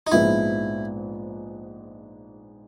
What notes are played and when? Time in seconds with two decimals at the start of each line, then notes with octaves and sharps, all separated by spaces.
0.07 D#4
0.12 A#1 G#2 F3 G#3 B3 E4